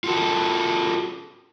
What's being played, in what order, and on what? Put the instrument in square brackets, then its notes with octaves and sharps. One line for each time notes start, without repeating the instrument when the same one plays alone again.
[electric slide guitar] F4 F#4 A4